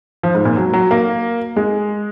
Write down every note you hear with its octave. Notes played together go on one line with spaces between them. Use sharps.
F3
G#2
A#2
F#3
F#3
A#3
G#3